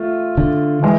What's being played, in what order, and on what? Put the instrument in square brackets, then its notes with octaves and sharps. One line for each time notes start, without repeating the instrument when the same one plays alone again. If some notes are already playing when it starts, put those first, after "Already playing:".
Already playing: [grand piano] A3 F4
[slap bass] D3
[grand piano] E3 G#3